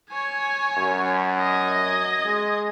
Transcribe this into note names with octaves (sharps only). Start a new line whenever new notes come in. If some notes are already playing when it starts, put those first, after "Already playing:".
C#5 G#5
F#2
D#5 G#6
G#3